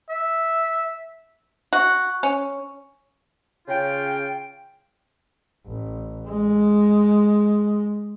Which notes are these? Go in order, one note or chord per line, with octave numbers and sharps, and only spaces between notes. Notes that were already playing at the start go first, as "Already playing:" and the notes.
E5
F#4
C#4
C#3 F4 G5
A1
G#3